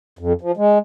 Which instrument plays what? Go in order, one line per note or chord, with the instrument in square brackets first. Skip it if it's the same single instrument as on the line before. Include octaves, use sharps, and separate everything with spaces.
[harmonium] F2
F3
G#3